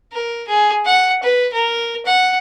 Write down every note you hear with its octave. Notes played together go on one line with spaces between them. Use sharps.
A#4
G#4
F#5
B4
A#4
F#5